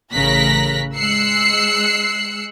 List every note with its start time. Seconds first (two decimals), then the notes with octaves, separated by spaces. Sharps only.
0.13 A1 C#3 A#4 F#6 A#6 B6
0.97 G#3 E6 F#6 C7 C#7